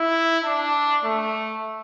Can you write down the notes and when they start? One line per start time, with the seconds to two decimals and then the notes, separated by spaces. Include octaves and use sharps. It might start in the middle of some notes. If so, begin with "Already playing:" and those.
Already playing: E4
0.45 D4
1.05 A3